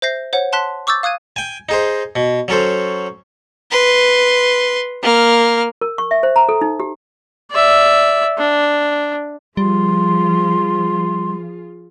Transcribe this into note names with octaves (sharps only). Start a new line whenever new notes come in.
C5 E5 G6 A#6 C7
C5 C#5 F#5
F#5 A5 C6 F#6 B6
C#6 D6 E6 G6 A6
F5 D#6 F#6 G#6 D#7
G5 G#5
D#4 G#4 C5
B2
F#3 C#4 A4 C5
B4 C6
A#3 F6
A#4
C#6
E5
C5
A#5
A4
D#4
G4
D5 E5
D4
F3 G3 F4 G#4 C6